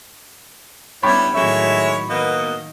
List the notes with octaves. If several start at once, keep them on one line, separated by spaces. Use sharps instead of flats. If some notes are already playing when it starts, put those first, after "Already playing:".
G3 B3 C#4 D4 E4 G4 C#5 B5
A2 D#3 F#3 G#3 A3 C#5 E5
B2 D#3 A#3 B3 D#5